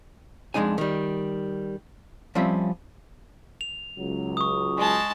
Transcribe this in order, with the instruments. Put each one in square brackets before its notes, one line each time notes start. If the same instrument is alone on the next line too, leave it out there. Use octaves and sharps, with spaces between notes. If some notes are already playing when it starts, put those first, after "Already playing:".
[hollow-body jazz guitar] F2 F3 G#3 D4 D#4 G#5
D#3 G3
F3 G3 C4 C#4 F4 E5
[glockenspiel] F7
[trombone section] C#2 F#3
[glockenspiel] C#6 D#6
[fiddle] G#3 A5